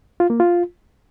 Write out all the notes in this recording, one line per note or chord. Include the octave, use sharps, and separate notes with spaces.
F4
A#3
F4